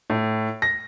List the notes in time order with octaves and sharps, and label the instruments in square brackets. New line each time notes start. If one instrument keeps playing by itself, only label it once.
[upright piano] A2
A#6